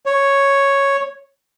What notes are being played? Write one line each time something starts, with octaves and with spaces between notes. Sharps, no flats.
C#5